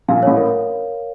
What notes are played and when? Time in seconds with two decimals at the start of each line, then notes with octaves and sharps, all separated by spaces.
0.08 A#1 A#2 F5
0.23 A1 A2 C#5
0.37 A#4